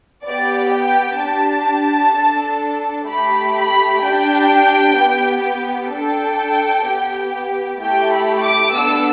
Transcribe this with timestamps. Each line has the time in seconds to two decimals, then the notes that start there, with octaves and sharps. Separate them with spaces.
0.25 B3 G4 D5
0.72 G5
1.20 D4 G4 A5
2.14 D4 A4
3.08 A3 G4 B5
3.56 B5
4.03 D4 G4 G5
4.97 B3 G4
5.92 D4 A4 G5
6.86 B3 G4
7.81 A3 E4 G4 G5
8.13 B5
8.44 D6
8.75 B3 D4 A4 E6